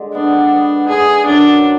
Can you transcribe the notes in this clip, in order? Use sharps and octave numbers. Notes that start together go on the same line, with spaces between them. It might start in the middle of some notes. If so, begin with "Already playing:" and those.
Already playing: D3 G#3
B3 D4
B3
D3 G#4
F#2 D4